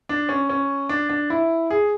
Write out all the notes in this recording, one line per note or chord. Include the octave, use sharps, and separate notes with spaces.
D4
C#4
C#4
D4
D4
E4
G#4